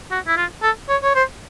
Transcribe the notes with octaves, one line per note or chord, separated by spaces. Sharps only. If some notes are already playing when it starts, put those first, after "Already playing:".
F#4
E4
F4
A4
C#5
C#5
C5